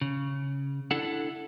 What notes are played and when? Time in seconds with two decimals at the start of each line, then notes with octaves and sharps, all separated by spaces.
0.01 C#3
0.91 D4 E4 A4 F#5